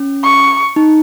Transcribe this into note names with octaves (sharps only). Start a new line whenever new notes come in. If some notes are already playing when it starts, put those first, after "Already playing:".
Already playing: C#4
C#6
D#4